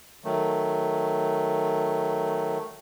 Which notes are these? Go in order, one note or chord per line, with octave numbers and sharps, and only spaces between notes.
D#3 F#3 A3